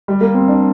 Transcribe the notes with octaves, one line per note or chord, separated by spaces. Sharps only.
G3
A#3
C4
D4